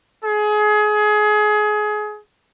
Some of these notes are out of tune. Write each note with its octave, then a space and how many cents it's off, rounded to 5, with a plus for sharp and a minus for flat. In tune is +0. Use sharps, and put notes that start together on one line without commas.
G#4 +25